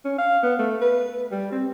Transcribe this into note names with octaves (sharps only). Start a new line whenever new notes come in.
C#4
F5
B3
A3
B4
G3
C4